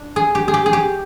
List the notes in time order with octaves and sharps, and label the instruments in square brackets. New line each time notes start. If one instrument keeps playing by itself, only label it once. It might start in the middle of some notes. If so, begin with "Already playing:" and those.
Already playing: [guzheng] D4
G#4
G4
G#4
G4
G#4
G4